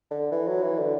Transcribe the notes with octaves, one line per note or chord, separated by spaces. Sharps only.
D3
E3
F#3
E3
D3